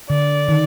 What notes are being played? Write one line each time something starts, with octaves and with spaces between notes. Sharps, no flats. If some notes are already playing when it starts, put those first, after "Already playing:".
D3 D5
D#3